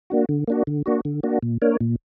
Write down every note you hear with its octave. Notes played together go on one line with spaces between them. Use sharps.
A#3 D4 F#4
D3
A#3 D4 F#4
D3
A#3 D4 F#4
D3
A#3 D4 F#4
A#2
A#3 D4 A#4 C#5
A#2